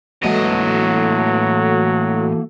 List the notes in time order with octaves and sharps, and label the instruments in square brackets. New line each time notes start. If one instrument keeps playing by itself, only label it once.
[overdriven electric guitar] A2 D#5 [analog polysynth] E3 F#4 A4 [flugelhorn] F#3 [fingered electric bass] G#3 A#3